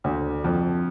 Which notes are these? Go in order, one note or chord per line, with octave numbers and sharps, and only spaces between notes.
D2
F2